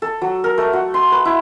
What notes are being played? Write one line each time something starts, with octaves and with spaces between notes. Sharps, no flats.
A4
F#3
A#4
A3
F#4
C6
B4
E4